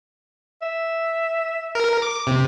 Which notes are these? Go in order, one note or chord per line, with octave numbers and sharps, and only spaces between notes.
E5
A#4
D6
C3